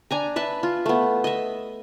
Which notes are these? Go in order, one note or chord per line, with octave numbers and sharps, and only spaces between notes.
D4 G#5 A#5
B4 E5 A5
F4
A3 B3
D#5 E5